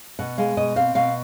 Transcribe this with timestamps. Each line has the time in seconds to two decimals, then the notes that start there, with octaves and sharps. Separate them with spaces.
0.19 B2 F#5
0.38 G#3 F5
0.57 B2 D#5
0.76 C4 F5
0.95 B2 F5